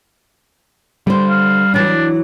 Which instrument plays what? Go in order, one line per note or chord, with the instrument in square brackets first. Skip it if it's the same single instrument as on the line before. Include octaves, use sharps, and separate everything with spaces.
[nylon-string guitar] D3 C5 [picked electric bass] G3
[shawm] F5
[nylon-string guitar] E3 F#3 [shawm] D4